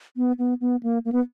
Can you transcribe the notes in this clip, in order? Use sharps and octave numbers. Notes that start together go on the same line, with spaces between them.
B3
B3
B3
A#3
A#3
B3